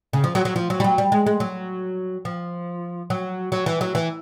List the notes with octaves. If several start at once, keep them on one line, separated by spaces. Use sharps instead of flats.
C#3
F3
F#3
F#3
F3
F#3
G3
F#3
G3
G#3
G#3
F#3
F3
F#3
F#3
E3
F#3
E3